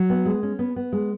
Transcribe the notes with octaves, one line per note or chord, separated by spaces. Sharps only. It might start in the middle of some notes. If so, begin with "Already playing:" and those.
Already playing: F#3
B3
G#3
C#4
B3
B3
G#3